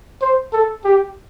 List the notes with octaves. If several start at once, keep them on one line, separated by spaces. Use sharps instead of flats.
C5
A4
G4